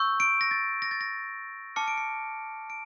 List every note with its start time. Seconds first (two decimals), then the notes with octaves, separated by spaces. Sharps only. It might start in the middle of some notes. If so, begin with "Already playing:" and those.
Already playing: C#6 E6 G6
0.20 D7
0.41 A#6
0.51 A6
0.82 A#6
0.91 A6
1.01 A#6
1.76 A5 D6 F6 C#7
1.88 D7
1.97 C#7
2.70 D7